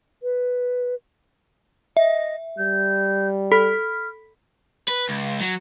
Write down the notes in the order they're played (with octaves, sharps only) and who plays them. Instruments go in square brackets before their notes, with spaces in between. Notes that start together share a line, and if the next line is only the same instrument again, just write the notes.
[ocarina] B4
[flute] D#5 [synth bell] E5
[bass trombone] G3 [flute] G6
[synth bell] A4 B5 B6 [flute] F6
[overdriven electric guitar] B4
C#2
F#3